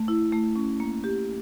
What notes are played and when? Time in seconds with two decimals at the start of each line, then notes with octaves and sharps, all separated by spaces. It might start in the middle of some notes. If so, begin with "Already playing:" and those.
Already playing: A3
0.08 E4
0.32 A3
0.56 C#4
0.80 A#3
1.04 G4